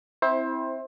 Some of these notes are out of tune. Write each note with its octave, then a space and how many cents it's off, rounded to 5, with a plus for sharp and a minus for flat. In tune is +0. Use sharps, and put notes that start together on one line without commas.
C4 +0 E4 -15 C5 +20